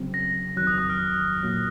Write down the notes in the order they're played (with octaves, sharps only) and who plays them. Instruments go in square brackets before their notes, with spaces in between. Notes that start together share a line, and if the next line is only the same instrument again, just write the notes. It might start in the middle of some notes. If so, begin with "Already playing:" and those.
Already playing: [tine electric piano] C#3 F#3 C4
[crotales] A#6
[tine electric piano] F2 D#3 F#3 [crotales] F#6
[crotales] D#6
D#6
F6
[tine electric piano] A#2 F#3 A#3